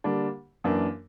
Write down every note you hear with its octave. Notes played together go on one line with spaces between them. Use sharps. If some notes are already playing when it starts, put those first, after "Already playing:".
D3 G3 A#3 D4
F#2 E3 A#3 D4